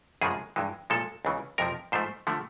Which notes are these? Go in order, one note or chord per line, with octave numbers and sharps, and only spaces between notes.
F#2 C#3 F3 G#3 G#4
G2 E3 G#3
A#2 F3 G#3 A4
C#2 C#3 E3
F2 C3 F3 A#4
G#2 F3 A3 C5
D3 F3 A3